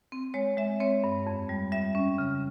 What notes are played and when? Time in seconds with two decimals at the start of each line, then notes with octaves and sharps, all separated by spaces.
0.12 C4
0.34 G#3 C#5
0.57 G#3 E5
0.80 C4 C#5
1.04 G2
1.27 F2
1.49 G3
1.72 G3 E5
1.95 C#4
2.18 C#3